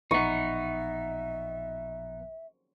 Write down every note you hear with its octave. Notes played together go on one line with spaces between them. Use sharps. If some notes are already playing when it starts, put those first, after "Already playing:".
A1 A#2 F3 B3 D#4 E5 C#6